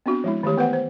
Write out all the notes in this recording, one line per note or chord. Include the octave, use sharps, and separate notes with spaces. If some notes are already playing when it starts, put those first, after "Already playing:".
B3 C4 D4 F#4
F3 G#3 E4
D#3 E3 A3 G4 C#5
B3 B4 C5 F#5
C5